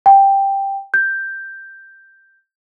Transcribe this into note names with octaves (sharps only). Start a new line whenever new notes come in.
G5
G6